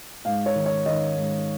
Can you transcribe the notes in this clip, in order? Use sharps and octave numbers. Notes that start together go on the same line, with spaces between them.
G#2 F5
C#5
D#3
C#5
D#3 D#5
G#2